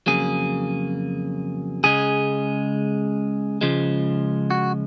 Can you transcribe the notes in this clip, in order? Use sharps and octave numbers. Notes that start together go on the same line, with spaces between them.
F2 C#3 F#3 A#3 G#4
C#2 C#3 G#3 G#4
C#2 C#3 F3 G#3
F#4